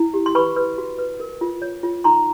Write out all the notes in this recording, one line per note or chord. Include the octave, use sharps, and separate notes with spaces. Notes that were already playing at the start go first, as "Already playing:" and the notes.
Already playing: E4
G4
C6
B4 B5 C#6
B4
F#4
B4
A#4
F4
C#5
F4
D#4 A#5 C6